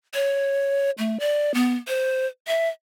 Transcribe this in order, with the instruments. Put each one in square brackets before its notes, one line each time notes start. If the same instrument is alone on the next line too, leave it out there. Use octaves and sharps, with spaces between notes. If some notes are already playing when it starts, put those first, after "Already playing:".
[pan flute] C#5
A3
D5
B3
C5
E5